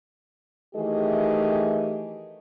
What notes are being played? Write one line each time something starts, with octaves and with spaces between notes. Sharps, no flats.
D#3 E3 A3 G4 G#4 D#5